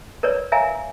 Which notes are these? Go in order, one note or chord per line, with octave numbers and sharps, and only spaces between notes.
A#4 B4 C#5 D5
A#4 C#5 E5 F5 G#5 A#5